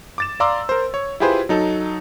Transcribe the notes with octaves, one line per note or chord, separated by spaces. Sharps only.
D6 A6 E7
D5 F5 A#5 C6 D6 E6
A#4 C5
C#5
E4 F4 G4 G#4 B4 C5
F#3 D#4 A4